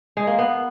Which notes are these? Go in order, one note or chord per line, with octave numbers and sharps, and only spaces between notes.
G#3
A#3
B3